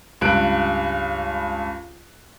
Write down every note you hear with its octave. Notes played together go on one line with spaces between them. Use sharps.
C#2 G2 F#6 D7